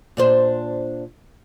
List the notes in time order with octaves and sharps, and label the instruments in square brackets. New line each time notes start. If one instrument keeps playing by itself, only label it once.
[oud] A#2 D4 C5